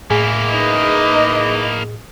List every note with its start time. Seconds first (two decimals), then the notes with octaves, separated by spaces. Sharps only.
0.10 A2 A#3 E4 G#4
0.52 D#4 B4 D#5